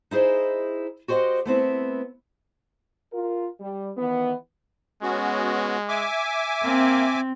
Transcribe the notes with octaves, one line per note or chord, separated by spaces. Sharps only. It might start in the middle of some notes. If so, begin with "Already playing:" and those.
D#4 E4 G#4 C5 D#5
F#4 G4 C5 D5 D#5 F#5
A3 B3 C4 E4
F4 A#4
G3
D#3 E3 B3
G#3 B3 C#4 F#4
E5 G#5 D6
A#3 C4